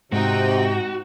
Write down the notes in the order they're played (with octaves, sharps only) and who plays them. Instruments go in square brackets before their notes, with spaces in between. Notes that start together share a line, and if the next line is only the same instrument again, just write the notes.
[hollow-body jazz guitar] G#2 [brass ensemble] C3 [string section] C4 D#4 G5 [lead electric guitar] F#4